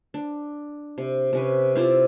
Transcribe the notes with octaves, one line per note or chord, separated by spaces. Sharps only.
D4
C3
C3 C#4 B4
C4 E4 F4 D5